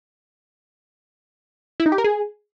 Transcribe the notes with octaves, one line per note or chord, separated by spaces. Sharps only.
E4
D#4
G4
A#4
G#4